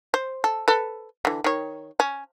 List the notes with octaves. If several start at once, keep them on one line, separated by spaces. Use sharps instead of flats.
C5
A4
A4 B4
D3 E3
D#3 C#5
C#4